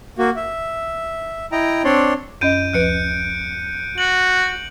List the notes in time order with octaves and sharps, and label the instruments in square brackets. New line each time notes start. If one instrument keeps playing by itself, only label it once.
[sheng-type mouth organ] A#3 F#4
E5
E4 D#5 G5 A#5
C4 D4 C#5 D5 C6
[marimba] F#2 C#4 D#5 [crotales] G6 D7 D#7
[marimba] D2 F3 B4 [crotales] F#6 C#7 D7
[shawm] F#4 [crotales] F#7